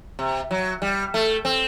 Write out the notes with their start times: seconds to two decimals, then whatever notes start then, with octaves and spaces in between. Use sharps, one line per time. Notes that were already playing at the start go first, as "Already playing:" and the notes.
0.19 C3
0.51 F#3
0.82 G3
1.14 A3
1.45 C4